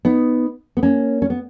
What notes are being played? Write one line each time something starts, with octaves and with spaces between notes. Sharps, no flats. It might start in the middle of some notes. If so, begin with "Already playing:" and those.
B3 D#4
B3
A#3 C#4
C#4
B3